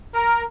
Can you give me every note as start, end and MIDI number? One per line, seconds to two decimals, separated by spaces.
0.15 0.42 70